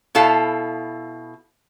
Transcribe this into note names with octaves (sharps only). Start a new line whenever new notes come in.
B2 E4 A4 F5